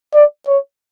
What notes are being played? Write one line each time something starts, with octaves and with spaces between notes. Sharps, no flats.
D5
C#5